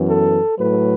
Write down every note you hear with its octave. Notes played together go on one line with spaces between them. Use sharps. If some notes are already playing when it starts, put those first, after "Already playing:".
Already playing: F#2 E3 B3
A4
A2 F#3 A3 B4